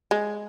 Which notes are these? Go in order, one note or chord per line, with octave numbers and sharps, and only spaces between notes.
G#3